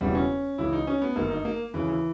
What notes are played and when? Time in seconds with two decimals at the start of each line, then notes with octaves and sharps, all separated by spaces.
0.01 E1 E2 C#3 E3 G3
0.15 C#4
0.58 C#2 C#3 E3 E4
0.73 D#4
0.87 C#4
1.02 B3
1.16 G1 G2 D#3 A#3
1.31 D#4
1.45 A#3
1.73 D#2 C#3 E3
1.88 E3